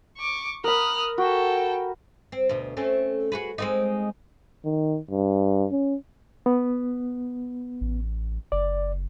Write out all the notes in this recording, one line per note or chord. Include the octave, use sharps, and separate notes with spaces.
C#6 D6
A#4 B5 D#6 F6 F#6
F#4 A4 G5
C4
D2 B2
A3 C4 C#4
F#4 G#4 B4
G#3 C4 D#4
D#3
G2
C#4
B3
A1
F#1 D5